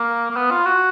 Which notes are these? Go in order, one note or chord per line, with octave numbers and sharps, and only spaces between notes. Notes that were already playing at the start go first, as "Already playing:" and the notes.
Already playing: A#3
A#3
B3
F4
F#4